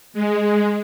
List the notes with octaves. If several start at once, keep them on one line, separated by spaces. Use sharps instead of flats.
G#3